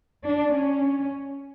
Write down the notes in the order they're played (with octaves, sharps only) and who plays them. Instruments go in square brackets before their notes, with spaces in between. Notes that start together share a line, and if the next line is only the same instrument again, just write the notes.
[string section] D4
C#4